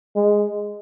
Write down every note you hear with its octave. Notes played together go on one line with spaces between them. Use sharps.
G#3